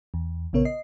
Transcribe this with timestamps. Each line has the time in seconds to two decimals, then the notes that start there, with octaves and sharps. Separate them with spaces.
0.14 E2
0.53 A#1 C#3 B3 A#4 C#5
0.65 D#5 C7